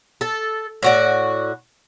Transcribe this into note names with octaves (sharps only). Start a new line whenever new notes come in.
A4
A2 F#4 D5